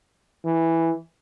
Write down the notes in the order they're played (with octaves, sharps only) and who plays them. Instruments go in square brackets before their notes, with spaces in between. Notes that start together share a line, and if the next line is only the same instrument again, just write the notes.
[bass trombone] E3